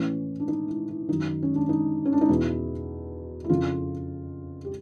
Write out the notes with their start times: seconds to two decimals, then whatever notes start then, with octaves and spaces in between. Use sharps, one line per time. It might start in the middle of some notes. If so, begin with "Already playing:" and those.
Already playing: A2 E3 C#4
0.40 D4
0.48 D#4
0.68 E4
0.89 E4
1.08 F#2 D#3 D#4
1.43 C#4
1.56 D4
1.69 D#4
2.05 C#4
2.13 D4
2.21 D#4
2.29 E2 B2 E4
3.44 E4
3.49 F2 C#3 F3 F4
4.65 G4